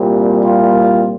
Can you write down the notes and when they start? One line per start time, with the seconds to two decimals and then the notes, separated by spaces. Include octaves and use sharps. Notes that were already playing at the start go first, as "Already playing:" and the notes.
Already playing: C2 A#2 G3 C4
0.44 F4